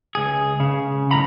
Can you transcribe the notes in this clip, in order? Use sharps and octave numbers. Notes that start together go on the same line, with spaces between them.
C#2 G#4
C#3
B1 A2 A#5 B5